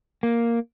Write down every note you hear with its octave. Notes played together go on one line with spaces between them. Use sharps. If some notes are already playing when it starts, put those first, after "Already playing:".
A#3